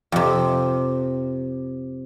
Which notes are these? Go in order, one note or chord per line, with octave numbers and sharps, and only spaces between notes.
F2 C3